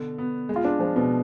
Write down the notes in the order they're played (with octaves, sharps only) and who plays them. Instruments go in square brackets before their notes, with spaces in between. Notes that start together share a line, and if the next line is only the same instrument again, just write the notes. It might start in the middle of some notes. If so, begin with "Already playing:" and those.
Already playing: [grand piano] B2 D3
B3
G#3
[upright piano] F4
D4
[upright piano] F3 [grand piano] G#3
[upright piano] B2